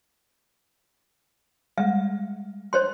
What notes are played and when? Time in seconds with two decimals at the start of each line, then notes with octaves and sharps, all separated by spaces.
1.78 G3 G#3 E5
2.73 C5 C#5 C6